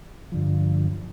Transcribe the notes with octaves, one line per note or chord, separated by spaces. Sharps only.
G2 D3 F3